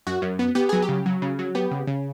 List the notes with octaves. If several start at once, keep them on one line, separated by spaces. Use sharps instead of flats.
F#2 F#4
F#2
B3
B3 G4
F#3 G#4
G4
C#3
F#3
C#3
F#3
B3 G4
C#3
C#3